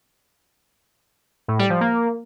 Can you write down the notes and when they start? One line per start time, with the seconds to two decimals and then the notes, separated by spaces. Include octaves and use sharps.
1.48 A2
1.59 G3
1.70 F3
1.81 A#3